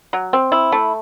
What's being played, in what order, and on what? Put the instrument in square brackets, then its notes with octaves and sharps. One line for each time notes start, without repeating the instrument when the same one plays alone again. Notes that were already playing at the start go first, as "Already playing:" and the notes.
[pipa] F#3
C4
E4
A3